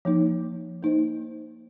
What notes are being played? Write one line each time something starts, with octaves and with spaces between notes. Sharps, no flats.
F3 A#3 D#4
A#3 D#4 C5 D#5